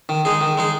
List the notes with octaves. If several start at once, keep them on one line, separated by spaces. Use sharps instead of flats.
D#3
G#3 D#4 G#4
D#3
G#3 D#4 G#4